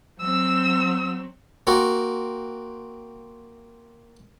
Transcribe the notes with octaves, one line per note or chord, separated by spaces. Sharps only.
F#3 C4 E6
A#3 C4 F#4